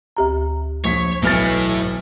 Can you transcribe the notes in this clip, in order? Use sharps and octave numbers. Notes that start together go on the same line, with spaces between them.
D2 G4 A#5
A#1 C#5 B6
B1 A2 E3 F6 A6